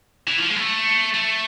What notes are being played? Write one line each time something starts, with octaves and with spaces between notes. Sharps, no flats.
E3
F3
G#3
B3
A3
A3